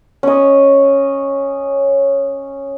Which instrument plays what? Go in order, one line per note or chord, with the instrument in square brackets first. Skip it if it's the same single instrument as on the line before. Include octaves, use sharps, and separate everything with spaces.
[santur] C#4 D#5